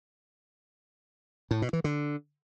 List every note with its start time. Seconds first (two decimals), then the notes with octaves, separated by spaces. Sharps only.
1.51 A2
1.62 B2
1.73 E3
1.84 D3